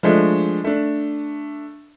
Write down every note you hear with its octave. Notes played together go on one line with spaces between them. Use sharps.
F3 G#3 A3 D4
A3 D4